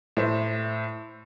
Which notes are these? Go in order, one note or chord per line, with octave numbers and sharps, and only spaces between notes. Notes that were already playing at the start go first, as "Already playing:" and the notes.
A2 C5 E5